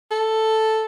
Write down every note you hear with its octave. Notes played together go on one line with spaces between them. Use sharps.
A4